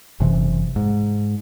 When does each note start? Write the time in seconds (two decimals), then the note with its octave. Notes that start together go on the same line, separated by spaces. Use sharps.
0.20 F#1 C3 E3
0.76 G#2